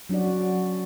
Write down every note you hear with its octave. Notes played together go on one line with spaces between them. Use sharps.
F#3 C#4 D4 F#4 D5